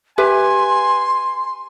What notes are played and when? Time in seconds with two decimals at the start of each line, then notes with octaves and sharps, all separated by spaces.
0.18 G4 B4 E5 G#5 C6